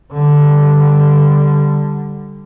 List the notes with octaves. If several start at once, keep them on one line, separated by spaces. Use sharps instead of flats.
D3 G3